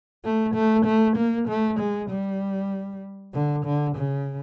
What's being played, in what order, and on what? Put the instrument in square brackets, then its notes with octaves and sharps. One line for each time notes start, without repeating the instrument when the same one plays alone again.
[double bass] A3
A3
A3
A#3
A3
G#3
G3
D3
D3
C#3